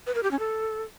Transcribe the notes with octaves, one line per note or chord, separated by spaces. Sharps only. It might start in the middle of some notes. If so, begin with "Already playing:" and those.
B4
A#4
G4
C#4
A4